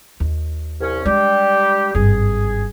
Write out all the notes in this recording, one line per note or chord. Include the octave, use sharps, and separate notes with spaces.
D#2
C2 C#4
G3 G#3 D4 G4
G#1 G2 G#4